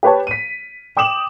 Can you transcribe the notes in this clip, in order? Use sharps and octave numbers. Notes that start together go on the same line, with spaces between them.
G4 B4 C#5 A5
B6 D#7
G5 D6 D#6 E7 F#7